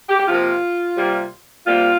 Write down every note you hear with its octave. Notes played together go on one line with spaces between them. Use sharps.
G4
G4
C3 F3 A#3 F4
C3 G3 A#3
C3 G3 A#3 F4